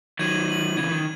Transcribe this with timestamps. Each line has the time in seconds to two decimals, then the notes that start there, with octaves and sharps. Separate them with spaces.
0.19 D#3 F#3 G#6 D#7 F#7
0.48 G#6 D#7 F#7
0.76 C#3 E3 G#6 D#7 F#7
0.91 D#3